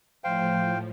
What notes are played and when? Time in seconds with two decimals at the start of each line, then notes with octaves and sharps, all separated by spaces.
0.24 A2 F3 C5 F5 G5